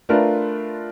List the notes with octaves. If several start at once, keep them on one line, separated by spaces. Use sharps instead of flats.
A3 D4 F4 A#4 B4